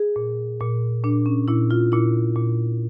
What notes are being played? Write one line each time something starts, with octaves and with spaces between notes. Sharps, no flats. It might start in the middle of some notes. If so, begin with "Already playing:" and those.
Already playing: G#4
A#2
A#2
A#2 D4
C#4
A#2 E4
F4
A#2 E4
A#2